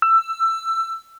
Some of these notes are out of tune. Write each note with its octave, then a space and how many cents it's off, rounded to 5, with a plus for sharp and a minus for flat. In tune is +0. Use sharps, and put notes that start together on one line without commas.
E6 +15